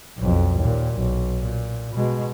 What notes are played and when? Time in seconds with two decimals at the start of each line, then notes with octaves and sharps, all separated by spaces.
0.18 B1 F2
0.59 D#2 A#2
0.92 B1
1.40 A#2
1.95 B2 G#3